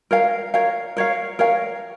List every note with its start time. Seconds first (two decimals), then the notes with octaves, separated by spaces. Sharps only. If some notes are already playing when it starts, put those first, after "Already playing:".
0.11 A#4 C#5 F5
0.54 A#4 C#5 F5
0.97 A#4 C#5 F5
1.39 A#4 C#5 F5